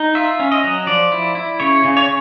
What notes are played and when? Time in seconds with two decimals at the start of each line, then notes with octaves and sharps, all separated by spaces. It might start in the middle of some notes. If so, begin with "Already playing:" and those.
Already playing: D#4
0.15 F4 E5
0.40 C#4
0.52 D#5
0.64 F#3
0.87 F3 D5
1.12 E4
1.35 E4
1.60 C#3 C#5
1.84 C#3
1.97 C#5